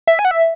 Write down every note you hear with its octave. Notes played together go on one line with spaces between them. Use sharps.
E5
G#5
F#5
E5